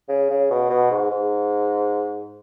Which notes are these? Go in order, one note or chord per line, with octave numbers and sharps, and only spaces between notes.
C#3
C#3
B2
B2
G#2
G#2